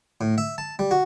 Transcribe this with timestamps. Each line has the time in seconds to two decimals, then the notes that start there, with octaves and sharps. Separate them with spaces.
0.21 A2
0.38 E5
0.58 A5
0.79 G3
0.91 F#4